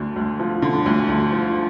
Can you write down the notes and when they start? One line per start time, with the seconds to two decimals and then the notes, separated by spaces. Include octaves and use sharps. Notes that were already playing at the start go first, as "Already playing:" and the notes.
Already playing: D2 D3
0.16 D2
0.40 F3
0.62 D3
0.86 D2
1.09 D2
1.32 F3